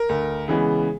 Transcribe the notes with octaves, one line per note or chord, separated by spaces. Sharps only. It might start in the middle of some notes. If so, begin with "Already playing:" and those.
Already playing: A#4
D2
C#3 E3 G#3 B3